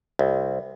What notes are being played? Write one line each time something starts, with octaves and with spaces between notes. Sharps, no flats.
C2